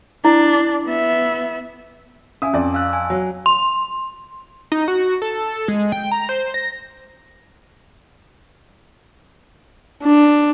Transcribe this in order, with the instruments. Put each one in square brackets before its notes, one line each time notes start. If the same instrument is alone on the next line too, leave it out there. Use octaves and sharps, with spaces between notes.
[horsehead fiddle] D4 [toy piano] E4
[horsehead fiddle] B3 E5
[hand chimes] C#4 G#5 [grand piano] E5 D#6
[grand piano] F2 D5
[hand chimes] F5 E6 F#6
G#5
[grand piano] F#3
[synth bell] C6
[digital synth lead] D#4
F#4
A4
G#3
G5
A#5
C5
A#6
[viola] D4